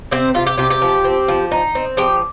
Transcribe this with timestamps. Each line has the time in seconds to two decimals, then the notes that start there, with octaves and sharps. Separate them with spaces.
0.11 C3 C4 C5
0.34 C3 F4
0.47 G4
0.57 C3 G4
0.70 G4
0.82 F3
1.04 C4
1.28 F3
1.52 D#4
1.75 C4
1.97 F3 G4